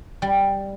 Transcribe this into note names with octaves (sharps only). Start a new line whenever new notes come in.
G3